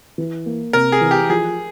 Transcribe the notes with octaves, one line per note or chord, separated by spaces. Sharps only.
E3
A#3
C3 A#4
G#4
E3
G4
F3 G#4